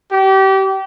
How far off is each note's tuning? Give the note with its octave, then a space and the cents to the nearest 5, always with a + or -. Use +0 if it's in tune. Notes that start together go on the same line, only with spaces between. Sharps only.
G4 -30